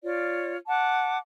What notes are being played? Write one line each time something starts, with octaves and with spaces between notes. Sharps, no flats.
F4 C#5 D5
F#5 A5 D6